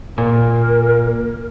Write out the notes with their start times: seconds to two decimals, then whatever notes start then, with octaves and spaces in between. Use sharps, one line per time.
0.18 A#2 A#4